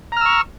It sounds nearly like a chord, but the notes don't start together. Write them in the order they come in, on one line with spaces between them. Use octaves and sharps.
A#5 F6 E6 C#6